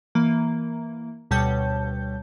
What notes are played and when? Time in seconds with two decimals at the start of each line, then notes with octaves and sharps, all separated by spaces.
0.15 E3 A#3
1.31 D2 B2 G3 C#5 A5 G6